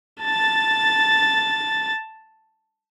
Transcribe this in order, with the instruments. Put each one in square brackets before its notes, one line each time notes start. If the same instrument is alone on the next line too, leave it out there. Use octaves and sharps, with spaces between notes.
[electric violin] A5 A6